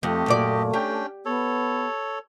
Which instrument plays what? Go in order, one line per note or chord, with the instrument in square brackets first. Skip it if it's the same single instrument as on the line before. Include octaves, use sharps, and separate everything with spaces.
[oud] F2 [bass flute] A3 [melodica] G4 D#5
[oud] F#2 A#2 D5
[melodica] C#4 D4 G5 [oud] G4
[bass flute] B3 [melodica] A4 C#5